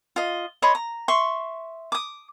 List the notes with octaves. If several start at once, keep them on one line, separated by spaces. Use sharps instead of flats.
F4 D#5
C#5 D#5 B5 C6
A#5
E5 C6 C#6
D6 D#6